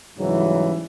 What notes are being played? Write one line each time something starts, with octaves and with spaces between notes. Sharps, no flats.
G#2 C#3 E3 F#3 G3